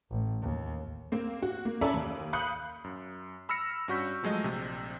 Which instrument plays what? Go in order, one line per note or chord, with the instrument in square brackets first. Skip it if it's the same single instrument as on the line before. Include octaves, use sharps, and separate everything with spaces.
[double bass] A1
D#2
[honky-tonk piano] A#3 C4
F#4
A#3
C#4 A4 D5 E5 A#5 B5
D#2
F5 B5 D#6 F#6 G6 C#7
[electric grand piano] F#2
B5 E6 F6 A#6 C#7
G2 C#4 F#4 C#6 G6 B6
F3 F#3 G#3 A3 D#5
A#1 C3